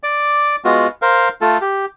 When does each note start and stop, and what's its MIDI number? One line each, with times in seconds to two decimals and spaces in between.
0.03 0.56 74
0.03 0.56 86
0.65 0.87 56
0.65 0.87 59
0.65 0.87 65
0.65 0.87 66
1.02 1.29 70
1.02 1.29 72
1.02 1.29 77
1.41 1.58 57
1.41 1.58 65
1.41 1.58 69
1.61 1.86 67